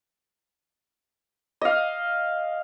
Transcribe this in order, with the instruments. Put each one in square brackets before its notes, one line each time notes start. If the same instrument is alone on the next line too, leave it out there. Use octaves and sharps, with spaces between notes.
[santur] D#5 F5